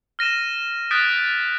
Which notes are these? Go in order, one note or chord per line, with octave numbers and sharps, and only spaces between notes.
F6 A#6 D#7 E7
D#6 F#6 G6 A6 B6 D7